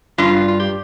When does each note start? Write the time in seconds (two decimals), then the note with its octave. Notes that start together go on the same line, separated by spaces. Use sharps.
0.18 G2 F4
0.48 F4
0.60 G4